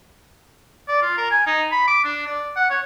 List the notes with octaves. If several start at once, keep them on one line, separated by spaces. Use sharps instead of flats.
D5
F4
A#4
G#5
D#4
B5
D6
D4
D5
F#5
C#5